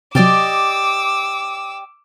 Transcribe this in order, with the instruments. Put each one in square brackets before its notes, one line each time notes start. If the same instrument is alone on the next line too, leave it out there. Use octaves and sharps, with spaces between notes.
[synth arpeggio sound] C3 F#3 [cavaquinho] G4 D5 D#5 [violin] D6 E6